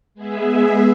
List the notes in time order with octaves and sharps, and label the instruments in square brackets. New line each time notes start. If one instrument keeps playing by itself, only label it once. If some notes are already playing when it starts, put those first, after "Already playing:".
[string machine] G#3 B3 G#4 E5